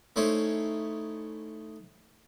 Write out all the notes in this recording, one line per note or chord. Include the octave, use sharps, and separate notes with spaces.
A3 C#4 D#4 E4 C5 C#5